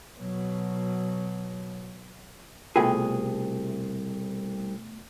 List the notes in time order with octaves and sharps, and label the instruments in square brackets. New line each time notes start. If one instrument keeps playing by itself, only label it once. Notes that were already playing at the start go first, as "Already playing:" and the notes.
[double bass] B2 F#3
[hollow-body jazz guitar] C2 G#4 [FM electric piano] B2 A3 [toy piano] F4 A#4 G5